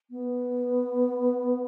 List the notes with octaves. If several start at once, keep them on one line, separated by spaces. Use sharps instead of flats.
B3